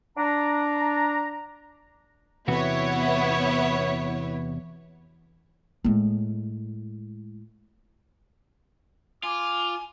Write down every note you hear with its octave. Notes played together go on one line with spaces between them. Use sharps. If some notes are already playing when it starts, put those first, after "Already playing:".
D4 A#5
E2 C3 B3 E4 F#4 C#5
A2 G#3
F4 G#5 D6